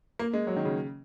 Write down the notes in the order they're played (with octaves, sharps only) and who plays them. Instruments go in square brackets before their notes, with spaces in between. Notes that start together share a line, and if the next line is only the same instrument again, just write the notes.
[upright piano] A#3
G#3
F#3
D#3
C#3